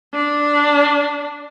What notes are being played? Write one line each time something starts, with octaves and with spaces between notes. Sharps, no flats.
D4